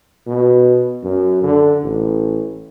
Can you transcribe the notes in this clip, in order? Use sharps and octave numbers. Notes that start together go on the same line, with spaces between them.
B2
F#2
D3
A1